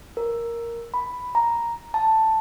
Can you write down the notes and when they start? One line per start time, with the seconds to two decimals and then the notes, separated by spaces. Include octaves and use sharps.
0.17 A#4
0.94 B5
1.35 A#5
1.94 A5